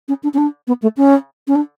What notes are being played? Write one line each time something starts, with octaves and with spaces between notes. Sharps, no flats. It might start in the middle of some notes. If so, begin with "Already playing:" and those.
C#4
D4
C#4
D4
B3
A3
C#4
C#4
D4